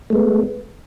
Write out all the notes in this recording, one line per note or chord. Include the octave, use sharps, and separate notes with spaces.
G#3 A3 B3